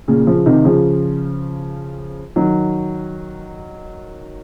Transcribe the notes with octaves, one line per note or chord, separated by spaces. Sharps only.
A#2 C#3
C#3 F3
C3 D#3
C#3 F3
D#3 F#3